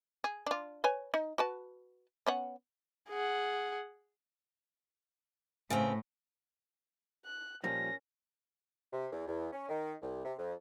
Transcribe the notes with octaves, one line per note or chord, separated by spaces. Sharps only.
G#4
D4 F4
B4 C#5 G#5
D#4
F#4 B4 A5
B3 C#4 F#5
G#4 F#5
A2 C#3 B3 C4
F#6
A#2 F3 G3 C#4 A#4 A#6
C3
E2
E2
C#4
D#3
C2
C3
F2